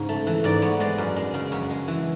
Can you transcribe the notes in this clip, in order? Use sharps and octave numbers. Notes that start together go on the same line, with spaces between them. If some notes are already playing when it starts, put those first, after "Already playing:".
Already playing: G#2 C#3
A3
E3
G#2 D5
B3 C#5
G#3 D5
F#2
G#3
C#3
F#2 C#5
G#3
E3